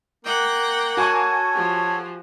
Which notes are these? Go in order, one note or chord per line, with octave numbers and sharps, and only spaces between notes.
A#3 F#5 G5
F#4 A4 C#5 G#5 C#6
F3 G4